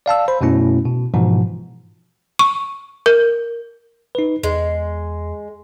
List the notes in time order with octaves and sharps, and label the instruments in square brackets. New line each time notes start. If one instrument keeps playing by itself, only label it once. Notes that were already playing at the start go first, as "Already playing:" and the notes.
[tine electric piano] D5 F5 A5 E6
C5 B5
F#2 B2 A3 C#4 E4
B2
G#2 B2 E3 F3
[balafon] C#6
A#4
[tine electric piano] D#4 B4
[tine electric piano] E2 [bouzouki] G#3